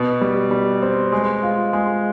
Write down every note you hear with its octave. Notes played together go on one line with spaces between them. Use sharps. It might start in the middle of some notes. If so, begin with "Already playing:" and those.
Already playing: B2
G3
G3
C4
G#3
F4
G#3